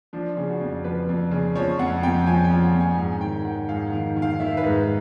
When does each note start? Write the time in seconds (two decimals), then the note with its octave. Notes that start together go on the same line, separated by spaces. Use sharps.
0.13 F3 D4
0.37 C#3
0.49 F#4
0.61 F2
0.84 F3 B4
1.09 F2
1.31 C#3
1.55 F3 C#5
1.79 F2 F#5
2.03 F2 G5
2.26 F3 G#5
2.44 G5
2.50 F3
2.63 F#5
2.74 F2
2.80 G#5
2.98 G#2 G#5
3.21 D#3 G5
3.45 D#3 F#5
3.69 G#2 F5
3.87 D#3 F#5
4.16 D#3
4.22 F5
4.40 D#3 E5
4.57 B4
4.63 G#2